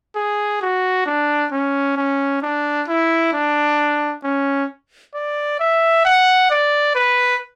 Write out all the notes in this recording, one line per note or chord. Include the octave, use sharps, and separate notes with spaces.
G#4
F#4
D4
C#4
C#4
D4
E4
D4
C#4
D5
E5
F#5
D5
B4